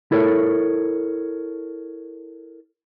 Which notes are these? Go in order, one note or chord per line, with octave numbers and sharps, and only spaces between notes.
E4 A4 A#4 C#5